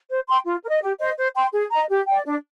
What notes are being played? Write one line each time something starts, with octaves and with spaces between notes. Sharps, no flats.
C5
G5 C6
F4
A#4 D#5
G4
C5 D#5
C5
G5 C6
G#4
D#5 A#5
G4
D5 G5
D4